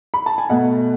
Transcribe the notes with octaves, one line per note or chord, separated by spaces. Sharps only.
B5
A5
G#5
B2 A3 D#5 F#5